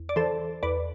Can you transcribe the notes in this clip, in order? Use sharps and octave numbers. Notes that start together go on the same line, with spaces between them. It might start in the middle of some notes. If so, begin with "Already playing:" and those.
Already playing: E2
D5
E3 A4 C5
E2 B4 D5